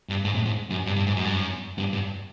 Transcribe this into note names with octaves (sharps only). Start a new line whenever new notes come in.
G2
G#2
A2
G#2
F#2
G2
G2
G#2
F#2
G2
F#2
G2
G2